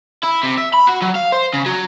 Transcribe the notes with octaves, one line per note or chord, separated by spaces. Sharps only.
E4
C3
E5
B5
F#4
F#3
F5
C5
C#3
F#3